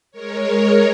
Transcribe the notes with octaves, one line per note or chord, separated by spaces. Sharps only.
G#3 A#4 C#5